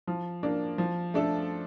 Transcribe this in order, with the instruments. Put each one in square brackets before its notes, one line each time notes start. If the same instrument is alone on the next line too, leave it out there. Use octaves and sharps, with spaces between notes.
[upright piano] F3
A#3 D4
F3
A3 D4 A4